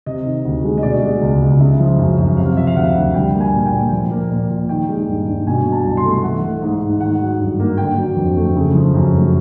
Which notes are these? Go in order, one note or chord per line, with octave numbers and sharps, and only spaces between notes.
C3 D#5
D#3
D2
G#3
D#5
B2 D5
G#3
C#2
C#2
C#3 E5
F3
F#2
F#2
C3 F5
F3 E5
F5
D2 F#5
D2
G3 G5
A#3
G#5
A#2
G5
A#2
F3
A#3
A#2
A#2
D#3 G5
G#3
G2
G2
B2 G#5
F#3
A5
C2
C6
A3
E3 F#5
A3
G#2
G#2
D#3 F#5
F#3
G2
A#3
D3 G5
F#3
F2
A3
C#3
F3
F#2
A3